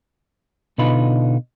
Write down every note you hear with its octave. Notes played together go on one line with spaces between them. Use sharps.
B2 D3 D#4 F4 B4 B5